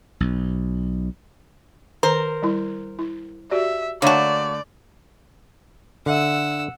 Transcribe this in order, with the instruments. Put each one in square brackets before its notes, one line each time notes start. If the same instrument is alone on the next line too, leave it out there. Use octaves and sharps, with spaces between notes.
[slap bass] B1
[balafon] D#3 [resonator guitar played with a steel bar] A#4 [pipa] C5
[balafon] G3 E4
E4
[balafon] F#4 G4 D5 [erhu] E5
[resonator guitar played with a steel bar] D3 A3 A5 [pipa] A#3 F#4 [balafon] C#5 [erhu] D5
[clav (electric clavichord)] D3 E5 [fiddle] F#5 E6